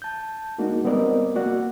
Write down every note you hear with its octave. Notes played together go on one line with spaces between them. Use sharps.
A5 G6
G#3 A#3 D4 D#4 F#4
G3 B3 C4 A#4 D5 D#5
A#3 F#4 D5 F#5